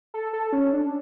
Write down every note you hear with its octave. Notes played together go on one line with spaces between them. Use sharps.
A4
A4
C#4
D4